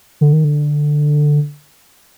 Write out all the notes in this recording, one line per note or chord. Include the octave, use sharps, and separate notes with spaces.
D3
D#3
D3